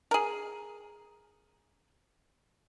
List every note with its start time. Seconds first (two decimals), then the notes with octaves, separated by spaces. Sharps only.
0.11 G#4 A#4